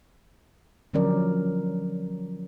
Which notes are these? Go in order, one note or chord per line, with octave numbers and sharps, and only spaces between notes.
D3 F3 F#3 C#4 A#4 D5